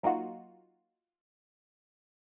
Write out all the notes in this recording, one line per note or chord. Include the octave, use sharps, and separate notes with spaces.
F#3 A#3 D#4 F4 F#4